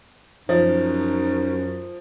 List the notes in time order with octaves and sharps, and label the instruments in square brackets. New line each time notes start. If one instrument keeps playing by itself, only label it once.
[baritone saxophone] F#2 [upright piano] F3 [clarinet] D#4